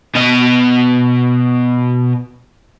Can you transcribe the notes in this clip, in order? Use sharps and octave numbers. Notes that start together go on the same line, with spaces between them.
B2 D#5